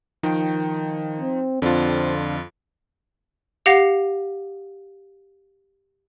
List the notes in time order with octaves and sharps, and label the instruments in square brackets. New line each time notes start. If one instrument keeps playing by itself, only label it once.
[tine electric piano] D#3 G5 [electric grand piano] F3 D#4
[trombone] C4
[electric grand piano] F2 F4 [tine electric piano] D3 D4 [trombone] C4
[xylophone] G4 F5 F#5 A#6 C7